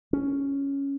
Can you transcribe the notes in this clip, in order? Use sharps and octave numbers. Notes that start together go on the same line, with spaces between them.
C#4